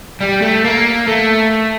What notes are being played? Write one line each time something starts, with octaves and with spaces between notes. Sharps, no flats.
G3
A3
A#3
A3